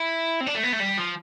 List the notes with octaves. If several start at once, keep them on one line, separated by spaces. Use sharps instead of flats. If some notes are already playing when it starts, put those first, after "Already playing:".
Already playing: E4
C4
D4
A3
B3
A3
G3
F3